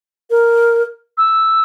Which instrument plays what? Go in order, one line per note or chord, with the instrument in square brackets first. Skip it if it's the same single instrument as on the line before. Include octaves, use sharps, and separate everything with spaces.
[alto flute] A#4
[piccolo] E6